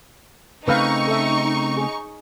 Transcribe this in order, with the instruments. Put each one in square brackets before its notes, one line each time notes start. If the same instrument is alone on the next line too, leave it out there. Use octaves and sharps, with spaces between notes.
[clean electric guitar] C#3 A3 C4 [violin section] D#4 C#6 [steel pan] B4 F5
[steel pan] A4 E5
G#4